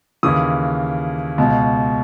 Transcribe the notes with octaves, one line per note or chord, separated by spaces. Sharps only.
D#2 C#3 E3 D#6
C#2 B2